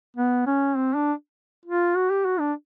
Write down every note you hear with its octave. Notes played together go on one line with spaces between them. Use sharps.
B3
C#4
C4
D4
F4
F#4
G4
F#4
D4